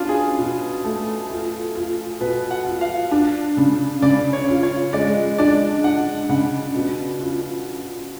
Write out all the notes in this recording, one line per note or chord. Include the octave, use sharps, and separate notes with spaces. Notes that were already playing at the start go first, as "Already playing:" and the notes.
Already playing: B2 C#4 D4 F4
G#4
B2
A3
F4
F4
B2 B4
F#5
F4
F5
D4
C#3
C#3 D5
C#5
F4
C#5
G#3 D5
D4 D5
D4 F#5
C#3 F#5
B2
F4